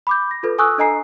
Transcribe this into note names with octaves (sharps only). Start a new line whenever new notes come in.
B5 D6 G6
A#6
F4 A4 B4
A4 G#5 C#6 D#6 E6 F#6
D4 A4 D#5 G#5 A#5 C7